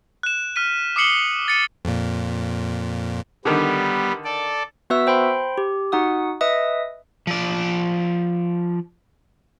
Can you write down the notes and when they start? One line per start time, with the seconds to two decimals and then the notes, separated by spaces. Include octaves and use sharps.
0.23 F#6 E7
0.56 F6 B6 D#7
0.96 D6 D#6 C7 C#7 F#7 G7
1.48 A6 C#7 D#7
1.85 F2 A#2
3.45 D3 D#3 G3 B3
4.25 A4 D5
4.90 B3 F#4 B4 E5 E6
5.07 C5 G5 B5 C6
5.58 G4
5.92 D#4 F#4 F#5 D#6
6.41 B4 D#5 E5 D#6
7.27 F3 D5